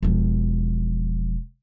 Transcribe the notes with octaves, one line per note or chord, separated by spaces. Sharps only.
E1 F3